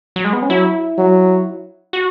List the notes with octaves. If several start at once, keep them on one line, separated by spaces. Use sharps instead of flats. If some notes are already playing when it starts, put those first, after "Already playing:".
F#3
G#3
B3
C#4
F#3 E4
F#3
F#4